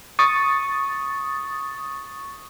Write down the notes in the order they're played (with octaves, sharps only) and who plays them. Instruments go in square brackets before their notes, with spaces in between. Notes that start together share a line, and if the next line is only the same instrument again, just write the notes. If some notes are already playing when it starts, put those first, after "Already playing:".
[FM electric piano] C#6 D#6 A6